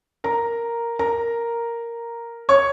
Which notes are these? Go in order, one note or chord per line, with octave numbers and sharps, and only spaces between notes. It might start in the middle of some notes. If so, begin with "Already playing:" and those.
A#4 A#5
A#4 A#5
C#5 C#6